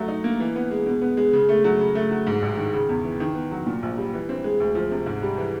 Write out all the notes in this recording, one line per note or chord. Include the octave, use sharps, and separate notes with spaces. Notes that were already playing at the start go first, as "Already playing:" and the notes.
Already playing: F#3 A3
D#4
A#3
E3
B3
G#3
B2
B3
G#3
C#3
A3
F#3
C#3
A3
F#3
G#2
A1
D#3
C#3
E2
E3
D#3
B3
F#3
A#2
A#1
G3
E3
C4
G#3
D2
F3
C3
G#2
G3
E3